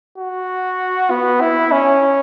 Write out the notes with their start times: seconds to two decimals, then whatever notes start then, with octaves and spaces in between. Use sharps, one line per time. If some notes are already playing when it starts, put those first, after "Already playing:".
0.18 F#4
1.11 B3
1.41 E4
1.72 C#4